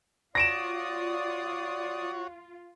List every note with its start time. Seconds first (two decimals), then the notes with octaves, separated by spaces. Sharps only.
0.35 F4 F#4 C#5 D5 D#6 A#6 D7 E7